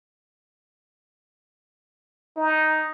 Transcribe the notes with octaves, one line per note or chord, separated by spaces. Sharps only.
D#4